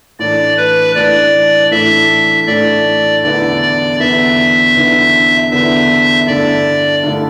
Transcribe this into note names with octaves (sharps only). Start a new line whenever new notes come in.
A2 E3 A3 D4 D5
B4
A2 E3 A3 D4 D5
A2 E3 A3 D4 E5
A2 E3 A3 D4 D5
E2 D3 B3 E4 D5
D5
E2 D3 B3 E4 E5
E2 D3 B3 E4
E2 D3 B3 E4 E5
G2 D3 A3 E4 D5
G2 D3 A3 E4